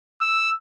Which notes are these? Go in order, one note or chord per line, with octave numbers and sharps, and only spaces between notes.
E6